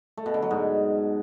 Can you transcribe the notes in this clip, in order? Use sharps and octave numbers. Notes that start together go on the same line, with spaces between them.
A3
B2
D3
F#3
G#2